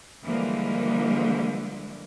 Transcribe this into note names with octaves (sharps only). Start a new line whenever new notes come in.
D3 E3 F3 G3 G#3 A#3